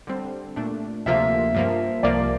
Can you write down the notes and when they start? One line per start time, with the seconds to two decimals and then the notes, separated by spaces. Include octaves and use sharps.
0.07 D3 G3 C4
0.56 A#2 A3 D4
1.06 D2 C3 F3 A#3 F4 E5
1.55 G2 F3 A#3
2.03 C2 C3 F3 A#3 D5